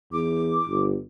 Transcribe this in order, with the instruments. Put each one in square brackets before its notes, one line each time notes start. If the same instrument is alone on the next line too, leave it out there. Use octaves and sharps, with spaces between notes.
[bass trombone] E2 [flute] D6
[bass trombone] G1